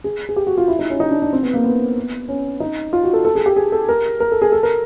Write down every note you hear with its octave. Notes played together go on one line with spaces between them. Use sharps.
G#4
G#4
G4
F#4
F4
E4
D#4
C#4
D#4
D4
D4
C4
B3
A#3
B3
C#4
D#4
F4
F#4
A4
A4
G#4
G4
G#4
A4
A#4
A#4
A4
G#4
A4
A#4